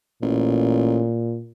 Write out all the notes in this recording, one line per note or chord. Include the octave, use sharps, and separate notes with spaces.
A1 A#2